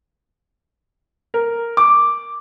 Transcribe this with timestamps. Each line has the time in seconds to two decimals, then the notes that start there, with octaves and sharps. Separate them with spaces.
1.34 A#4
1.77 D6